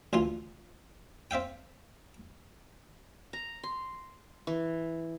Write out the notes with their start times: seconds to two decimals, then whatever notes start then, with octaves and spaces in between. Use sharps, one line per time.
0.13 D2 E3 F4 C6
1.31 C4 E5 F5 G5
3.33 A#5
3.63 C6
4.47 E3